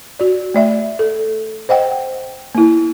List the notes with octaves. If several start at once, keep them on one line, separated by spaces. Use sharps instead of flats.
F#4 D5
A3 D5 E5
A4
C5 D#5 F#5 G5
A#3 E4